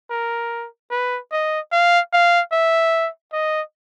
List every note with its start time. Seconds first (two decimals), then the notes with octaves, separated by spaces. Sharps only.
0.10 A#4
0.91 B4
1.32 D#5
1.71 F5
2.13 F5
2.52 E5
3.33 D#5